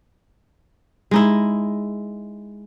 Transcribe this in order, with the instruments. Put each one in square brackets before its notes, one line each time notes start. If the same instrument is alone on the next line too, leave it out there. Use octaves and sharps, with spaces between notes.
[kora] G#3 D#4 E4